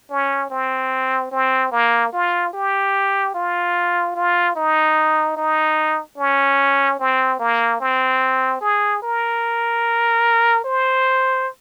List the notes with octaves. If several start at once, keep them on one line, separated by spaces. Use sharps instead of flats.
C#4
C4
C4
A#3
F4
G4
F4
F4
D#4
D#4
C#4
C4
A#3
C4
G#4
A#4
C5